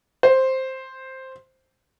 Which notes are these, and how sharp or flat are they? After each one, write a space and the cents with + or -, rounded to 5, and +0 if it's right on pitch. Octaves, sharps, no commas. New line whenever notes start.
C5 +5